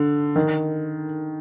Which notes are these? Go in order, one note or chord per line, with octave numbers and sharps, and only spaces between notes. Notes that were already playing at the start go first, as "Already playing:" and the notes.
Already playing: D3
D#3